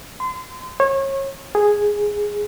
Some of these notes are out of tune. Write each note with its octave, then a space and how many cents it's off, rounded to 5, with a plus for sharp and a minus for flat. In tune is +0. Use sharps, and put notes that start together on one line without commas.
C6 -30
C#5 -30
G#4 -5